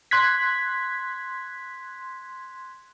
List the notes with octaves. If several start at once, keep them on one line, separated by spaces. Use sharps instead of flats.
C6 F#6 G#6 B6